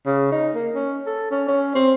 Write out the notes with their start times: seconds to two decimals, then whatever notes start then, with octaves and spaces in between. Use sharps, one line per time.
0.06 C#3
0.32 D#4
0.55 A#3
0.75 C#4
1.07 A4
1.31 C#4
1.48 C#4
1.75 C4